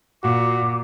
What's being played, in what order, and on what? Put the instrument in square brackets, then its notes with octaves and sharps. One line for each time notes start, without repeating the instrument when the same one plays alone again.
[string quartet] A#2 [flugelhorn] F#4 [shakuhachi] D6